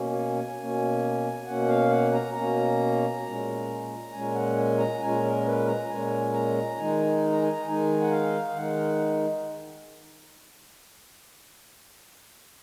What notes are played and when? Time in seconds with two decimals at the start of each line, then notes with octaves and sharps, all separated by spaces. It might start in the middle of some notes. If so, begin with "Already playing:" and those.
Already playing: B2 A#3 C#4
0.13 G#5
0.36 G#5
0.58 B2 A#3 C#4
1.46 B2 A#3 C#4 F#5
1.68 F5
1.90 F#5
2.13 A#5
2.35 B2 A#3 C#4 A#5
3.24 A#2 G#3 C#4
4.12 A#2 G#3 C#4 G#5
4.34 F#5
4.57 G#5
4.78 A#5
5.01 A#2 G#3 C#4 G#5
5.23 A#4
5.45 B4
5.67 A#5
5.89 A#2 G#3 C#4 G#5
6.33 A#5
6.78 D#3 G#3 D#4 G#5
7.32 A#5
7.42 G#5
7.52 A#5
7.67 D#3 G#3 D#4 G#5
8.02 F#5
8.11 F5
8.55 D#3 G#3 D#4 F#5